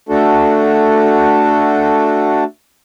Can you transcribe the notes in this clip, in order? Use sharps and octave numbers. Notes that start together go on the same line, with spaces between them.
A3 D4 F#4 A4